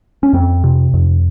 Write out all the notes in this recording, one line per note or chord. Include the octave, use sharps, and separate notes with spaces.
C#4
F2 C4
C3
F2